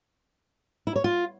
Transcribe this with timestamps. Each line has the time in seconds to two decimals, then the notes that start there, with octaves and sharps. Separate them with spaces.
0.87 E4
0.96 C#5
1.04 F4